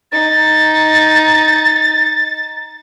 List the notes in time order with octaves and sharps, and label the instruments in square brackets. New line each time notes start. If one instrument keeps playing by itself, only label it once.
[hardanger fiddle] D#4 [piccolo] A6